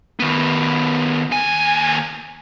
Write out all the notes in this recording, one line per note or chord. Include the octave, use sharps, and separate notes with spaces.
D#3 B3
D#2 G#5